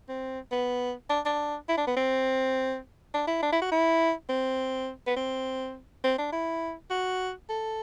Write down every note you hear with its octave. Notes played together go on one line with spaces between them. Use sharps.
C4
B3
D4
D4
E4
D4
B3
C4
D4
E4
D4
E4
F#4
E4
C4
B3
C4
C4
D4
E4
F#4
A4